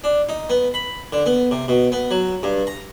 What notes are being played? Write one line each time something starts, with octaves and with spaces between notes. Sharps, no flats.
D4
D#4
B3
B5
D3
B3
C3
B2
B3
F#3
G2
A#5